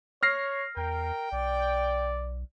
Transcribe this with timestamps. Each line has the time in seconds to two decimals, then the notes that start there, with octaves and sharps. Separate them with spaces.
0.23 C#5 F6 A#6 C7
0.77 E2 A#4 G5
1.32 B1 D5